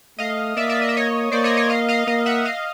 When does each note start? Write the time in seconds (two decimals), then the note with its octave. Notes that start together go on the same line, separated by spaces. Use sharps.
0.19 A3 D#5 F5
0.57 A#3 D5 E5
0.69 D5 E5
0.82 D#5
0.89 E5
0.97 C#5 D#5
1.32 A#3 C5 D5
1.44 C#5 D#5
1.57 C#5 D#5
1.70 D#5 F5
1.89 D#5 F5
2.07 A#3 D#5 F5
2.26 E5 F#5
2.45 D#5 F5